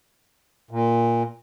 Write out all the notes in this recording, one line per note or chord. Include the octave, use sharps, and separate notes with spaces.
A#2